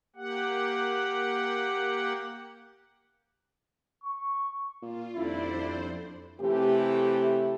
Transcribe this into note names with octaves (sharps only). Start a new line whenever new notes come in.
A#3 G4 F#5
C#6
A#2 F4
D#1 F2 D4 E4 A4 C5 D5
C3 E3 A3 G4